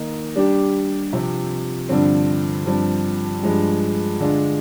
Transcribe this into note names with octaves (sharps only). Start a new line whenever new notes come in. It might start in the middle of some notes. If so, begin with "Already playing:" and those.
Already playing: D#3 A#3 D#4
G3 D4 G4
C3 F3 C4
G2 D3 F3 C4
G2 F3 C4
G2 F3 G#3
D3 G#3 D4 F4